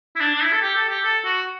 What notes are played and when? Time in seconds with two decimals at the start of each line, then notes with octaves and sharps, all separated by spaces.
0.16 E4
0.20 D4
0.35 D4
0.42 E4
0.52 A4
0.62 G4
0.76 A4
0.89 G4
1.04 A4
1.25 F#4